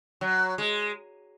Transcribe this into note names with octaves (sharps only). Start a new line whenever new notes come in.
F#3
G#3